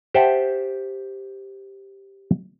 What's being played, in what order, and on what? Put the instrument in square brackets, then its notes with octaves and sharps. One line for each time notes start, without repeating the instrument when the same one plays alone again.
[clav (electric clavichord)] G4 C5 E5 F#5 G5 A5